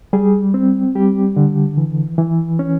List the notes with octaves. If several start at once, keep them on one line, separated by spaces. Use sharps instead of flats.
G3 G#4
C4
G3 G4
D3
E3
E3
C#4